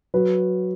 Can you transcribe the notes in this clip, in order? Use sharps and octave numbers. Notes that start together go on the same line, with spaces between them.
F#3 B4